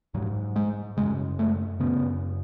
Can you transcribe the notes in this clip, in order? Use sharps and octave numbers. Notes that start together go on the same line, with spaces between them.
G#2 F#3
G#3
F#2 C#3 G#3
A3
F#2 C#3 B3